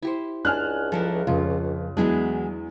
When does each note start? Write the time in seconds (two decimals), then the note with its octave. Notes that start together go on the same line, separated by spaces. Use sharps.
0.02 E4 G4 C5
0.45 C#2 D4 G#5 F6 F#6
0.92 F3 E4 A4 A#4
1.27 F2 C#3 F4
1.97 E2 E3 F#3 G#3 D4 E4 G#4